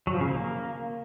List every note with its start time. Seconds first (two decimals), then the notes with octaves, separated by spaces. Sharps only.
0.07 F#3
0.14 F3
0.21 C#3
0.27 A#3